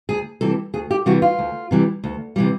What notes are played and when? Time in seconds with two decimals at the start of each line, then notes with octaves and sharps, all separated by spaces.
0.09 D2 G#4
0.41 C3 E3 G3 A4
0.74 D2 G#4
0.91 G4
1.06 C3 E3 G3 F#4
1.22 F4
1.38 D2
1.71 C3 E3 G3
2.04 D2
2.36 C3 E3 G3